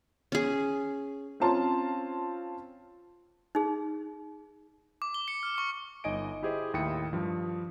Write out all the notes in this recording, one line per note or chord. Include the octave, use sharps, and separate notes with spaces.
C#4 G#4
C4 C#4 F4 A5 C6
D#4 G#4
D6
G7
C#7
F6
C#6
G1 D#4 D#5 G#5 D7
E4 G4 G#4 C5 D#5
D#2 A2 E4 G5 D#6 C#7
G2 F3